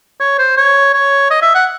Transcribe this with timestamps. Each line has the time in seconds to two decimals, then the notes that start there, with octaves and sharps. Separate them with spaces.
0.20 C#5
0.38 C5
0.57 C#5
0.94 C#5
1.30 D#5
1.42 E5
1.54 F#5